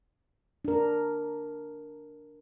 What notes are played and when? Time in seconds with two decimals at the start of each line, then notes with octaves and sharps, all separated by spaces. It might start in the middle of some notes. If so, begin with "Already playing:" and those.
0.65 D4 A#4